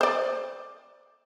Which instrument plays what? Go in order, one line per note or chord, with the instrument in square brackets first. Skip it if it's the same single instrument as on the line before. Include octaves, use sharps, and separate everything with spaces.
[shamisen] C5 D5